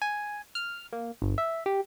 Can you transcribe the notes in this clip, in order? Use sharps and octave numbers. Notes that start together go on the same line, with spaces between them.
G#5
F6
A#3
G1
E5
G4